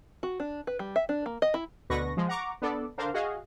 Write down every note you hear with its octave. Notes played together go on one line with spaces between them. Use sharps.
F#4
D4
B4
G3
E5
D4
A#3
D#5
E4
D2 B2 D3 B4 C#6 A#6
F3 G#3
F#5 A#5 C#6 D6
B3 D4 A4 D5
D3 D4 A#4 C5 F5
F#4 G#4 D#5 F5